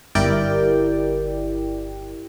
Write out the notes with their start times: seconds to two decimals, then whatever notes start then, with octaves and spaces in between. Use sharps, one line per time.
0.15 G1 E4 G4 A#4 D5 G5